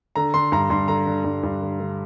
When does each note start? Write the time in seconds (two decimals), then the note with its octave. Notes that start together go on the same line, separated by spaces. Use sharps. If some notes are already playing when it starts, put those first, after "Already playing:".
0.16 D3 A#5
0.34 D3 C6
0.52 G2 A#5
0.70 G2 C6
0.88 D3 A#5
1.07 D3
1.24 G2
1.43 G2
1.62 D3
1.80 D3